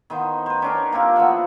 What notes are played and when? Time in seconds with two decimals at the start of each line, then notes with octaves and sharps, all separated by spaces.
0.10 D#3 B3 D#4 C5
0.46 B4 C5
0.62 C#4 D4 A#4
0.92 A#3 C4 F4 G4
1.16 F3 B3 E5 F#5